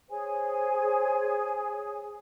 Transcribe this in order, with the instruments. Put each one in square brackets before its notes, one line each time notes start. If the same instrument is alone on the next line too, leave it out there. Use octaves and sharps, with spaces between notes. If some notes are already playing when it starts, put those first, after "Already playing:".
[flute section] G#4 C#5 G#5 [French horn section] C5